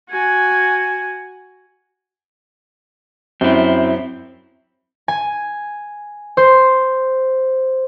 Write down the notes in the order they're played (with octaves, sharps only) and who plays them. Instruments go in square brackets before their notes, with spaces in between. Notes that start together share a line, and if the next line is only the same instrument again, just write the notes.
[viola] F#4 G#5
[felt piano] F#2 [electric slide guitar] C4 E4
[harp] G#5
C5